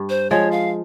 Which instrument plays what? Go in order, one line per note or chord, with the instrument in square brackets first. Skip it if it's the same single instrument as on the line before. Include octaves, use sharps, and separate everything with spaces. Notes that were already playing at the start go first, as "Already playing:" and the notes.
Already playing: [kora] G2
[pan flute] C5
[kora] F3 G#3 [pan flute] C#5
[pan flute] F5